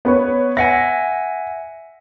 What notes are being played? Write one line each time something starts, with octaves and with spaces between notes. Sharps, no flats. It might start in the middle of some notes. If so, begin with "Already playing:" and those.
B3 B4 C#5
E5 F#5 G#5 A#6